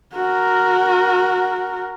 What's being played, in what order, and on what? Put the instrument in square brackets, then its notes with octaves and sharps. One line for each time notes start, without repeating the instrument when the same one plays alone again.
[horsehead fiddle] F#4 A#4